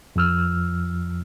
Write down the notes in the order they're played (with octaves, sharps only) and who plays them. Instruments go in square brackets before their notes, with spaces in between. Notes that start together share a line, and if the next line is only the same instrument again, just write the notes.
[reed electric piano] F2 F3 E6 F6